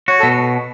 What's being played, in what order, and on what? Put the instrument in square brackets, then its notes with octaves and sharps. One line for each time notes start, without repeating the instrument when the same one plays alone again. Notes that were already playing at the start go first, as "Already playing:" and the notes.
[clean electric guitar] F#4 [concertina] C#5
[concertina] A4
[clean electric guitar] B2